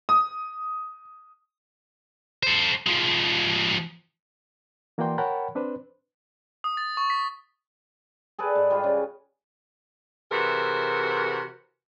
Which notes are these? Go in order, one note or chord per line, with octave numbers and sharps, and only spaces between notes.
D#6
A4 C5
F3 G#3
E3 A#3 F#4 D5 G5 C6
A#4 C#5 F#5 G5 A5 B5
C4 D4 B4 C5
D#6
A6
C#6
B6
G#4 A4 B4 D5
G#2
G3 F4
C#3
C3 E3 F#4 G#4 A#4